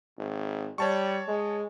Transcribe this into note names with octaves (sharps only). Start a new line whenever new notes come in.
G#1
G3 C#5 A5 C#6
G#3